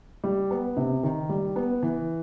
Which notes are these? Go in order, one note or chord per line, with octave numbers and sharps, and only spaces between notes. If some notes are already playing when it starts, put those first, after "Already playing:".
G3
B3
C3
D#3
G3
B3
E3